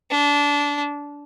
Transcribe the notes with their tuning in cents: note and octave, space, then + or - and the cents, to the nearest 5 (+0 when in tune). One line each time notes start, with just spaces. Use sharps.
D4 -20